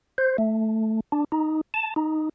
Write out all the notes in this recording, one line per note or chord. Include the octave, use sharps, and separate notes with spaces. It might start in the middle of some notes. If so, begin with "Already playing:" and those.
C5
A3
D4
D#4
A5
D#4